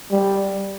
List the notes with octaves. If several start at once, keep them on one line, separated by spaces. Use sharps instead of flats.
G3